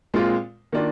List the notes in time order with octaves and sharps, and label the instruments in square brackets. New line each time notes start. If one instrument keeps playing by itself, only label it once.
[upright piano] A#2 G#3 C4 F4
D#3 A#3 D4 F4